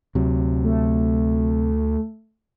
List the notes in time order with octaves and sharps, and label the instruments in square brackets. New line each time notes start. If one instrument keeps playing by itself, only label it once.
[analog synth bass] D2 [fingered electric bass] C3 F#3
[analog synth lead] A3